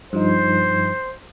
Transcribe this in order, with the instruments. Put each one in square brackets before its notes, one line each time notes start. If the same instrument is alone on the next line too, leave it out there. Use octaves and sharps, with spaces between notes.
[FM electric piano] G2 F3 D#4 [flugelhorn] C5